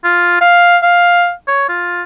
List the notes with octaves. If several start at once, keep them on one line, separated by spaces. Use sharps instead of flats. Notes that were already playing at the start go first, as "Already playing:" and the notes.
F4
F5
F5
C#5
F4